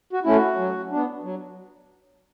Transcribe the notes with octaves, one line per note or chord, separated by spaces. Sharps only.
F#4
A3 C#4 E4
F#4
F#3
B3 D4
F#3